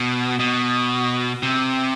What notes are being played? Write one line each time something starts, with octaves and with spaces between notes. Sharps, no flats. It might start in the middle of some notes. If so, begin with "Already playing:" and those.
Already playing: B2
B2
C3